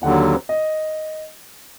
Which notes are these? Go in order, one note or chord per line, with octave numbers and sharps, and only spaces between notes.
D#2 D3 F#3 F#5
D#5